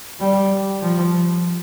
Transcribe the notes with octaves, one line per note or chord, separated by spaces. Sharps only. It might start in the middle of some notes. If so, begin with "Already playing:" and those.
G3
F3